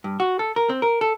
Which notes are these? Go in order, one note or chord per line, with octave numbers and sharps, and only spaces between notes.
G2
F#4
A4
A#4
C4
A#4
A4